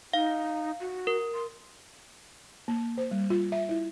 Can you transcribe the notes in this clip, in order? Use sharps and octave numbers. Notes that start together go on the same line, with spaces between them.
D#4 F5
F#4
A#4
C6
A#3
C5
G3
F4
E5
E4